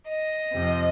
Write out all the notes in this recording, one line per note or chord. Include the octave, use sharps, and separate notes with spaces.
D#5
F2 C3 F3